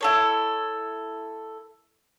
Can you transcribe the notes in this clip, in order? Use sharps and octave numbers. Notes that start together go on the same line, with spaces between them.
E4 A4 C#5